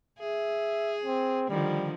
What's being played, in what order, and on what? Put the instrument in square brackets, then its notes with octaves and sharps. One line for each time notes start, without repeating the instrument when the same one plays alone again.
[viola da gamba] G#4 [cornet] E5
[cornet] C4
[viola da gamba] D3 D#3 F3 [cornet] G3